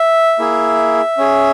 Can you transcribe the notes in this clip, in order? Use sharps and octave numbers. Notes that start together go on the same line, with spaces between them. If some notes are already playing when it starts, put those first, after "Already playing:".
Already playing: E5
A#3 E4 G#4
C#4 G#4